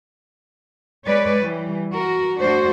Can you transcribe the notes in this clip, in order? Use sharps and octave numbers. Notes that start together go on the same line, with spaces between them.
G#3 B4 C#5 D5
E3 G3
F#4 A#4
A3 D4 F#4 C5